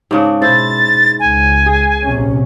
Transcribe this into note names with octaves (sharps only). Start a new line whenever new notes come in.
G#2 C#3 D4
B2 E4 C5 A6
C#2 G#5
G#4
A#1 C3 C#4